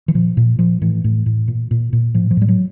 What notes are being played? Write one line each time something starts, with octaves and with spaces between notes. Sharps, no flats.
E3
A#2 F3
A#2
A#2 F3
A2 E3
A2
A2
A#2
A#2
A#2
A2 F3
F3
A2 G3
F#3